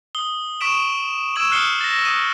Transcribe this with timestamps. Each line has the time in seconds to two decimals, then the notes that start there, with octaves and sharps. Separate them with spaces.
0.15 D#6 G7
0.61 C#6 D#6 B6 D7 E7
1.36 C#6 E6 G#6 D7 E7 F#7
1.51 D#6 F6 F#6 C7 C#7 G7
1.81 A6 A#6
2.03 D#6 D#7